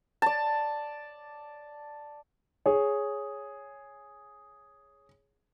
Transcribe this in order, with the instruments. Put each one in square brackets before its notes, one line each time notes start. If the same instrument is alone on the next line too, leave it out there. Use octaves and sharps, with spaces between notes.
[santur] D5 A5
[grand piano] G#4 C#5